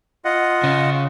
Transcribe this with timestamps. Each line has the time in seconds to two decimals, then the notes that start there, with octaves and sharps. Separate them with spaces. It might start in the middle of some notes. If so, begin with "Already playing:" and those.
0.25 F4 D#5 F#5
0.64 C#3